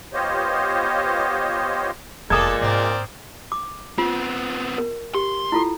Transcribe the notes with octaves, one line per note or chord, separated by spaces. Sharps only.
B3 F4 G4 C5 C#5 D#5
F1 E2 A#2 G#3 A4 D6 D#6 G#6
G#2 A#3 C4 A#4 D5
D6
B3 C4 F4
A#4
G4 C6
E4 F4 A4